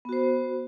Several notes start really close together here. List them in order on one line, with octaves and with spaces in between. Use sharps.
B3 F#4 C5